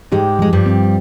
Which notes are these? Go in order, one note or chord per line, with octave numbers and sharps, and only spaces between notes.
G#2 G#3 G4
F3 G#3
G2 G3
C4